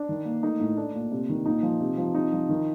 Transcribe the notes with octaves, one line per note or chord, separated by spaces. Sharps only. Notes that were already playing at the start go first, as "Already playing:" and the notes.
Already playing: D4
D#3
A#3
A3 D#4
A2
A3 D4
A#2
C3
D#3
A#2 D#4
F3
C3
F3
C3 D#4
F3
D#3